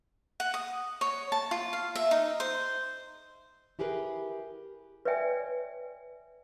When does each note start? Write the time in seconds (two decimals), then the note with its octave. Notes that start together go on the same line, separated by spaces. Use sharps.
0.40 F#5
0.54 D#6
1.01 C#5
1.32 A5
1.51 F4
1.73 F5
1.95 E5
2.11 D#4
2.40 C5
3.79 E4 G4 G#4 A#4 B4
5.05 B4 C#5 D5 E5 G5 G#5